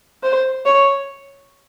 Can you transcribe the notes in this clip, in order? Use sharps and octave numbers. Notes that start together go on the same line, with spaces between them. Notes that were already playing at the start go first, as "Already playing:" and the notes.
C5
C#5